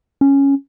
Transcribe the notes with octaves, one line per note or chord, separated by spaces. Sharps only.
C#4